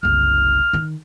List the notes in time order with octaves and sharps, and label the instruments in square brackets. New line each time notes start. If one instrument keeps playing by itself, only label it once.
[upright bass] F#1 C2 [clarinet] F6
[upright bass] D#3 D#4